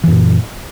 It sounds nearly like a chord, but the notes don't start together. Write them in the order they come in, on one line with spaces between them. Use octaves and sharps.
E3 F#2 A#2